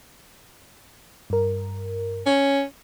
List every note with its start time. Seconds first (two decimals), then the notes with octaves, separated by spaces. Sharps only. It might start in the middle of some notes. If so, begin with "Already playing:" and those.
1.30 G2 A#4
2.26 C#4